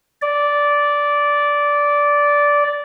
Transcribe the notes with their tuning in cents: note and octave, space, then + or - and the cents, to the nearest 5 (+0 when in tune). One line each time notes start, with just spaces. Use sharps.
D5 -10